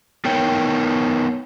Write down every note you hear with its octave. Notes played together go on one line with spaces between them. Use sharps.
B3 D#4 A#4 C#5 G5